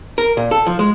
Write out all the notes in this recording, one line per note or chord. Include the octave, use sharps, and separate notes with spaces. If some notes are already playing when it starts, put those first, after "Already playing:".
A#4
A#2
A4
F3
G#3